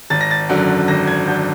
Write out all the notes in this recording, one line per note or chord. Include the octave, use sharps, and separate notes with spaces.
G#1 A6
A#6
A6
F#2 D3 F#3
G#1 A#6
G#6
F#2 D3 F#3 G6